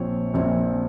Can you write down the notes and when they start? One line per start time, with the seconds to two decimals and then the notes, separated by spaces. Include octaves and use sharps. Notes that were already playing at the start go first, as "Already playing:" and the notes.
Already playing: A#1 A#2 F3 C4 C#5
0.34 A#1 A#2 F3 C4